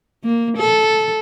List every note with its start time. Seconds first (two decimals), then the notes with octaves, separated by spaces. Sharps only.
0.24 A#3
0.58 A4